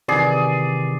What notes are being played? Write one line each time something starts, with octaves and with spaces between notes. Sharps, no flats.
C3 D#3 E3 G#4 D5